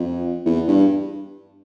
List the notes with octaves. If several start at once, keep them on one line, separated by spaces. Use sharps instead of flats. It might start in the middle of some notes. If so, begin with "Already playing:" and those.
Already playing: F2
E2
G2